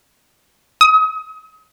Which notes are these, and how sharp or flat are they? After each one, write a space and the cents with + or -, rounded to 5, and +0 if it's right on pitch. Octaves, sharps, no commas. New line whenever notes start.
D#6 +35